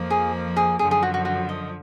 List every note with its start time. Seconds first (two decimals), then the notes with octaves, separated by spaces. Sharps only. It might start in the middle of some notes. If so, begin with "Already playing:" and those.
Already playing: F2 F3 A#3
0.10 G#4
0.57 G#4
0.79 F#2 D3 F3 G#4
0.91 G#4
1.02 F#4
1.14 F#4
1.25 F#4
1.49 D#5